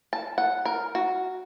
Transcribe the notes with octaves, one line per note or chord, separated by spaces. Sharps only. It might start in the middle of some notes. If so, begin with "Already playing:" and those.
A5
F#5
A#4
F#4